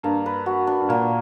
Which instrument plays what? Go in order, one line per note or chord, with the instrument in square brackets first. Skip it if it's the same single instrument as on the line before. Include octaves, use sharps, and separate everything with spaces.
[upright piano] G2 [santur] A#3
[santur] B4
F#4
D4
[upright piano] G2
[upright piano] A#2 [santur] A#3